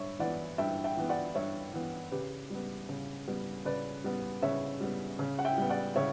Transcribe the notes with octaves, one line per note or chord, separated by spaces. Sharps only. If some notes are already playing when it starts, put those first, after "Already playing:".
Already playing: G2 C#5 E5
E3 B3 D5 F#5
G2 E5 G5
E5 G5
E3 B3
D5 F#5
G2 C#5 E5
E3 B3
C#3 G4 B4
G3 B3
C#3
G3 B3
C#3 B4 D5
G3 B3
C#3 C#5 E5
G3 B3
C#3
F#5
E5 G5
G3 B3
D5 F#5
C#3 C#5 E5